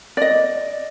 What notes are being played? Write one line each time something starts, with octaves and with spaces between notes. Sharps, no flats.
D5 D#5